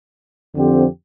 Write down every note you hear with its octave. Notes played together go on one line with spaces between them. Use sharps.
F2 D3 F3 C4 G4